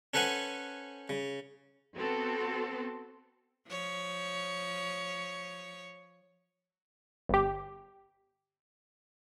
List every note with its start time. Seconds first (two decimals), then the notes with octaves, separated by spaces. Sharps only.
0.14 C#4 A4 B4 C5 F#5 G#5
1.09 C#3
1.96 B3 C4 F#4 A4
3.68 F3 C#5
7.29 G1 G4